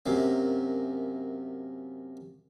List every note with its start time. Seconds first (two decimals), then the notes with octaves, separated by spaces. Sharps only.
0.06 F#2 C3 A#3